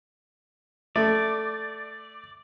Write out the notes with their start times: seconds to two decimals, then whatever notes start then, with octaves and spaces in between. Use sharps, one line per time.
0.96 A3 D5